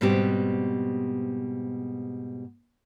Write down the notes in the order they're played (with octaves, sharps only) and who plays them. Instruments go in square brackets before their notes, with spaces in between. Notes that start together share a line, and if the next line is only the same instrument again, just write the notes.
[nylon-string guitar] G#2 B2 G3 B3 C4 G4